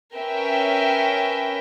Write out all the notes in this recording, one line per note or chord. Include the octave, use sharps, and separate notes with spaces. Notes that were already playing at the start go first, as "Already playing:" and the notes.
C#4 A#4 B4 E5 G5